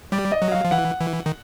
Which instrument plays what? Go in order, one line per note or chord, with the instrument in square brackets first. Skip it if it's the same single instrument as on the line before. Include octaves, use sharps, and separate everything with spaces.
[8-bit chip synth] G3 [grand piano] D5
[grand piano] D#5
[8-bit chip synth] F#3
[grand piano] F5
[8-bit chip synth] F3
[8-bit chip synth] E3 [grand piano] F#5
[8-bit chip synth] E3
D#3